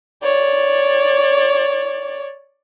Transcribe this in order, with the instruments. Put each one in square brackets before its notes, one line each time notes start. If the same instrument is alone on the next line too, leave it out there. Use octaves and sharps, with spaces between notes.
[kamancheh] C#5 D5